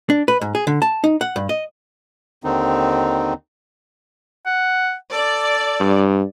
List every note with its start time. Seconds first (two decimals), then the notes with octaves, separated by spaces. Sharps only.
0.10 D4
0.28 B4
0.41 G#2
0.55 G#4
0.67 D3
0.82 A5
1.04 D#4
1.21 F#5
1.36 G2
1.49 D#5
2.44 D#2 D3 D#3 C4 D#4
4.46 F#5
5.13 A4 D5
5.80 G2